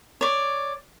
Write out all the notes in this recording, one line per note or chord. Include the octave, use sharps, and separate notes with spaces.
C#5 D5